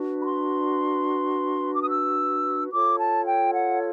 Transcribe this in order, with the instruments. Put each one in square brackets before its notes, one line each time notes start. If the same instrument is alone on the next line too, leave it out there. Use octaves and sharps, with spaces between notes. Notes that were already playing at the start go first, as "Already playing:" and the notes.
Already playing: [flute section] D4 F#4 B4
B5
C6
D6
D#6
E6
F4 A4 C#5 D6
A5
G5
F#5